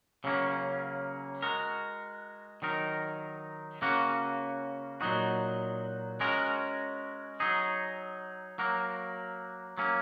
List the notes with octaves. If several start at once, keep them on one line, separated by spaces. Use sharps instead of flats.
C#3 F#3 A#3 C#4
G#3 F#4 A#4
D#3 F#3 D#4 A#4
C#3 A#3 C#4 F#4
A#2 F#3 D#4 F#4
G#3 C#4 F#4 A#4
F#3 D#4 G#4
F#3 A#3 F#4 A#4
F#3 A#3 C#4